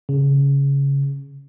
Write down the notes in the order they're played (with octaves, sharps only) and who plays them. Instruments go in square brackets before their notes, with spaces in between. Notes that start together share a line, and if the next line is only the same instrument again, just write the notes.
[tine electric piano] C#3